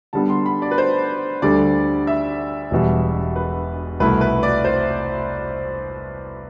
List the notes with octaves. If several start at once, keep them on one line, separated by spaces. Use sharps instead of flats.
D3 G3 B3 A5
C6
B5
D5
B4
C5
D2 D3 G3 D4 A4 D5
E5
E1 E2 B2 G3
B4
C2 B2 A3 E4 A4 B4
B4
D5
C5